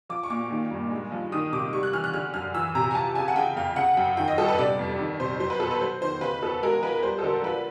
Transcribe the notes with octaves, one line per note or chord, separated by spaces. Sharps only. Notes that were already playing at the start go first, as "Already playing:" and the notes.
F3 D6
C#6
A#2 D6
D#3
G2
G#3
F3
D#3 D#6
C3 D6
G3 C#6
F#6
E3 F6
F#6
D3 F6
F#2 F6
E3 E6
C3 A#5
G#5
F3 A5
C#3 G#5
F#5
C#3 G5
F2 F5
C#3 F#5
F#2 G5
D#3 G5
D#5
G2 A4
B4
C3 D5
F2
D#3
C3 C5
F#3 C5
B4
B2 A4
B4
F#3 C5
D#3 C5
C#3 B4
E2 A4
G#3 A#4
F3 B4
G3 C5
A4
D3 A#4
F3 B4